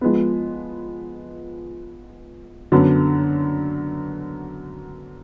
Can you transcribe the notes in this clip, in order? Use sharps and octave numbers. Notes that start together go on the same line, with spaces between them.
F3 G#3 B3
F#2 D3 F#3 B3